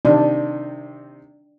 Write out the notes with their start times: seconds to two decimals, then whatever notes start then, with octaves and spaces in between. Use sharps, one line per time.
0.05 C3 D#3 D4